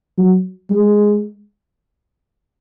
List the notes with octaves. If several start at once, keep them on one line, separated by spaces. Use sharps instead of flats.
F#3
G#3